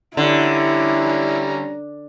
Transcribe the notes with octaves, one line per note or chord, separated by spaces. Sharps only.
D3 G3 C#4 E4 A#5